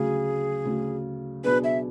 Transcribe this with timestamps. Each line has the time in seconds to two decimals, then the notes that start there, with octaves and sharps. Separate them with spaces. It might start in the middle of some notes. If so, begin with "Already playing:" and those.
Already playing: D2 C#3 F#3 G#4
0.65 D2 C#3 F#3
1.44 B2 F#3 B3 D4 G#4 B4
1.64 E5